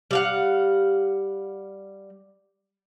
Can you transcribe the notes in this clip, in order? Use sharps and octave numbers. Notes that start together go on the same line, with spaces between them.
G3 F5 F#5